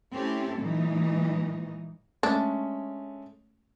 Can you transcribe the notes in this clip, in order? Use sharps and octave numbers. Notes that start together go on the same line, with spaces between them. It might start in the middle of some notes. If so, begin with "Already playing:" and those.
A3 C4 C#4 E4 G4 A4
A#2 E3 F#3 G#3 D#4
G#3 A3 C#4 D4